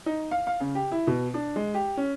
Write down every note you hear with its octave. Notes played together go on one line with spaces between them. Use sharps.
D#4
F5
F5
C#3
G4
E4
B2
D4
G#3
G4
C#4